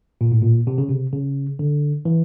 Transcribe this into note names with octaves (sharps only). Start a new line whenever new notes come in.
A#2
A2
A#2
C3
C#3
C3
C#3
D3
E3